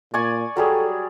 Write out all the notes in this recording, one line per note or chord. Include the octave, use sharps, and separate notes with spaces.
A#2 D5 G#5 C#6
F#3 G3 G#4 A4